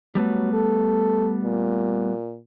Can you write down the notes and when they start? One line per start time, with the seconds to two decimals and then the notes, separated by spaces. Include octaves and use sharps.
0.15 F#3 G3 A3 B3
0.53 A4
1.43 A#2